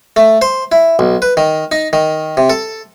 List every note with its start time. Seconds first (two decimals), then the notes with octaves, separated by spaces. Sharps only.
0.16 A3
0.42 C5
0.72 E4
0.99 B1
1.22 B4
1.37 D#3
1.72 D#4
1.93 D#3
2.37 C3
2.49 A4